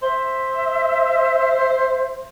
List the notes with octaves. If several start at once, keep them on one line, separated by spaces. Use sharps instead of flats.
C5 E5